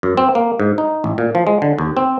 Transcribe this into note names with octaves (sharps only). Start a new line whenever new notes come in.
F#2
C4
A#3
G#2
D#4
A1
A#2
F3
G#3
D3
D#2
C4